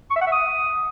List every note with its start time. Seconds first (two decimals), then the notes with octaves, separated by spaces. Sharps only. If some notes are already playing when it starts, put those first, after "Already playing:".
0.10 C#6
0.16 E5
0.21 F#5
0.27 E5
0.32 D#6